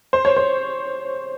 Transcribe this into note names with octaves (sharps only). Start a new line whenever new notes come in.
C5
C#5
C5